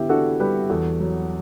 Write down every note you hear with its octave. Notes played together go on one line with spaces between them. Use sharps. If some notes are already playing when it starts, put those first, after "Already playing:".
Already playing: D3 B3 E4 G4
D4 F#4 A4
G3 G4 B4
E2 F#4 A4
F#3